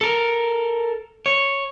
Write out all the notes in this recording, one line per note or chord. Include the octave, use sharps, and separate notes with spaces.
A4 A#4
C#5